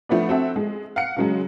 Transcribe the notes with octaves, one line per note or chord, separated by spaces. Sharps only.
F3 A3 B3 D4
C4 F#4 A4 E5
G#3
F5 F#5 C#7
C#3 F#3 G#3